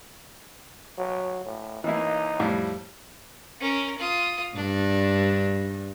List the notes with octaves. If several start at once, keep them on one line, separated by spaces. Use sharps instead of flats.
F#3
A2
E3 A#3 D#4 E4
F2 A2 G3
C#4 A#4
F4 D#6
G2 D4